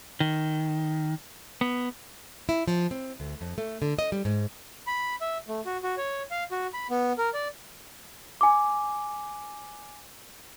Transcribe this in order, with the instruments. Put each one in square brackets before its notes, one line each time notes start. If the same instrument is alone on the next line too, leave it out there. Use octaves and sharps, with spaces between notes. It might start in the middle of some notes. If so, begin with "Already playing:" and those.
[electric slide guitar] D#3
B3
[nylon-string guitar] E4
F3
C4
D2
F2
A3
D3
D#5
G3
G#2
[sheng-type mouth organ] B5
E5
A3
F#4
F#4
C#5
F5
F#4
B5
B3
A#4
D5
[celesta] G#5 D6